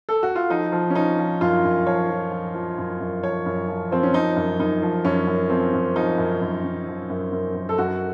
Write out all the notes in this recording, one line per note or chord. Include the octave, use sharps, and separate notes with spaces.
A4
F#4
F4
F3 D#4
F3
C#4
F3 D#4
F3
F#2 F4
F#2
F3 C#5
F3
F3
F3
F#2
F#2
F3 C#5
F#2
F3
F3 C4
C#4
F3 D#4
F#2
F#2 D#4
F3
F#2 C#4
F#2
F3 C4
F#2
F3 D#4
F#2
F#2
F#2
F3
F#2
F#2
F#2
A4
F#2 F#4